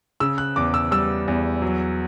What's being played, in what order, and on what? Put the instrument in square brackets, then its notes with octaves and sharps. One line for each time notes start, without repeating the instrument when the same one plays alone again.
[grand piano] C#3 E6
F#6
E2 D6
E6
G3 E6
E2
F#3